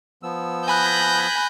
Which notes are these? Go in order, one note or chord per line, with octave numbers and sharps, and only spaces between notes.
F3 B3 E6
G#5 B5 F#6 G6 A#6